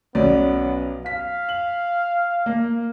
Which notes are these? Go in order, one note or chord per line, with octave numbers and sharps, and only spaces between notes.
B1 B3 C#4 D5
F5 B6
F#7
A#3